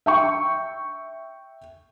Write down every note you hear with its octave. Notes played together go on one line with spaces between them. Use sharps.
E5 G5 C#6